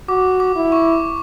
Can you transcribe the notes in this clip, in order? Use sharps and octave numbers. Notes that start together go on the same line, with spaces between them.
F#4 D6
D6
E4
C#6